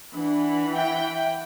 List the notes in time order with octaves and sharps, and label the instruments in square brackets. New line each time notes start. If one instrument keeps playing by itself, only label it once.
[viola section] E3 F#5 B5 [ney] D4
[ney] E5 [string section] G5